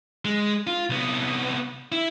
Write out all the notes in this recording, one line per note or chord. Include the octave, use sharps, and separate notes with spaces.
G#3
F4
C2 B3
E4